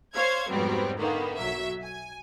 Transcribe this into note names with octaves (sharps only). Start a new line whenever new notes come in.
C5 C#5 F5 G#6
F2 G#2 F#3 G3 B3 C4
D3 D#3 A#3 B3
B1 F#3 E5
G#5